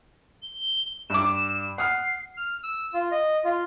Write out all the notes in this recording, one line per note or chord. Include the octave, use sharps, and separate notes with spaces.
G7
G2 D6 E7
F#5 D#6 F6 C7
F6
E6
F4
D#5
F4